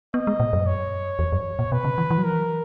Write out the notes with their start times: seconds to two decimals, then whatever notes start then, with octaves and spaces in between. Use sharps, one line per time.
0.14 B3 D#5
0.27 G#3
0.40 A#2
0.53 F#2
0.66 C#5
1.19 E2
1.32 F#2
1.59 A#2
1.72 B2 B4
1.84 C#3
1.98 E3
2.11 E3
2.18 F#3
2.24 E3 A#4